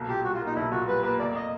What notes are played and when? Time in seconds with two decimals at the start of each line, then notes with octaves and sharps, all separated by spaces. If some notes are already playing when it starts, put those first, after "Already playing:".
Already playing: B1 A#3
0.08 A#2 G4
0.24 G3 F#4
0.34 F4
0.41 A#3
0.46 D#4
0.55 B1 E4
0.72 A#2 F#4
0.87 G3 B4
1.03 A#3 B4
1.19 F1 D5
1.35 D#5